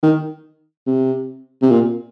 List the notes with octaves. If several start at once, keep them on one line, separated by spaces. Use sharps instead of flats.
D#3
C3
C3
A#2